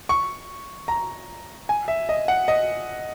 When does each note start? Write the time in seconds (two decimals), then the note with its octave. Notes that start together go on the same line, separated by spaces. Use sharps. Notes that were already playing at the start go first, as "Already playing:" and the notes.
0.09 C#6
0.88 A#5
1.69 G#5
1.88 E5
2.09 D#5
2.28 F#5
2.48 D#5